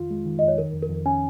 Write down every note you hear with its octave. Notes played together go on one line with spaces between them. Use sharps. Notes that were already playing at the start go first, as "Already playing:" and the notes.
Already playing: F2 D#3 F4
G#3
D#3
F2 D#5
C#5
D#3 A#4
F2
A#4
F2
C#4 G#5